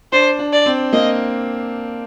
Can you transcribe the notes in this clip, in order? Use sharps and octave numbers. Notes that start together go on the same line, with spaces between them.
D4 C5
D4
D5
C4
A#3 D#5